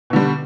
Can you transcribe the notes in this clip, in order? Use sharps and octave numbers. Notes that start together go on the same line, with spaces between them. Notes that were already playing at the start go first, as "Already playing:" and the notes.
B2 D3 G3